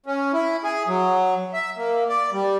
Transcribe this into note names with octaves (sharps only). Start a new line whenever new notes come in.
C#4
E4
G#4
F#3
E5
A#3
D5
G3